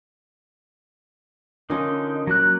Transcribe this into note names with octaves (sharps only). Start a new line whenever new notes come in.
D3 C#4 D#4 F4 A#4
F#3 A#3 F#6